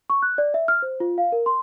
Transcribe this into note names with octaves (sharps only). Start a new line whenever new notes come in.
C#6
F#6
D5
E5
F6
C5
F4
F5
A#4
C6